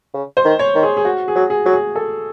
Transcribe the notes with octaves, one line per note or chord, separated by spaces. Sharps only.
C#3
C5
D#3
C#5
D#3
G#4
G#4
F#4
G#4
F#3
G#4
F#3
G#4
A4